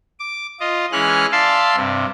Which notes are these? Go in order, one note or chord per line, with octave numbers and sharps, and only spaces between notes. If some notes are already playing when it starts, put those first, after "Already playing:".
D6
F4 D#5
E3 G#3 C#4 F6 F#6
D5 E5 F5 A5 C6
G2 C3